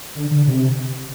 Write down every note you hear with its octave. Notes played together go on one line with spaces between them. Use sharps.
D3
D3
C3